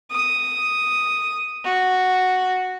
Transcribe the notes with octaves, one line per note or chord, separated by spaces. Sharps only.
D#6
F#4